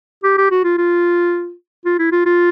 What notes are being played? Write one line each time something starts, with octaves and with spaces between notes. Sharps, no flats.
G4
G4
F#4
F4
F4
F4
E4
F4
F4